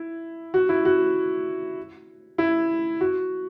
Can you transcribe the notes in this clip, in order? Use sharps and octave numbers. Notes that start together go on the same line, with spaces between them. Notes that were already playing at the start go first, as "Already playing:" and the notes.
Already playing: E4
F#4
E4
F#4
E4
F#4